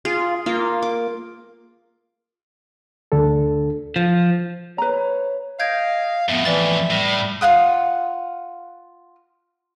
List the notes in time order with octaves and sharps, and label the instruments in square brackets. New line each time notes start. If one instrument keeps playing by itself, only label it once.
[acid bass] F4 [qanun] G#4
[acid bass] A#3 [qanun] F4
[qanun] D6
[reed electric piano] D2 D3 D4 A4
[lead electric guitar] F3
[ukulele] B4 A#5 [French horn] C#5
[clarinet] D#5 [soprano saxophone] F5 [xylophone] G6 G#6 D7
[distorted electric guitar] F2 A2 [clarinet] B3 [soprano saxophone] E5
[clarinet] E3 [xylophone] D5 A6
[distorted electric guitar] A2 [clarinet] G3 [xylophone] A#6
[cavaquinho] F4 F5 F#5 D#6